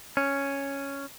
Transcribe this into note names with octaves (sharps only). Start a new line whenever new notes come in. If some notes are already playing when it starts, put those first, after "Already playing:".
C#4